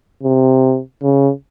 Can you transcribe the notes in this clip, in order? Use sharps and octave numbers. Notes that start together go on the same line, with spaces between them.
C3
C#3